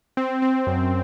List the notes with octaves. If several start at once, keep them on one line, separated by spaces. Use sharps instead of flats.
C4
C4
F#2